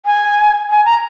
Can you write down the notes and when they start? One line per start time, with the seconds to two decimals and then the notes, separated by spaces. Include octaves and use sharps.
0.06 G#5
0.70 G#5
0.85 A#5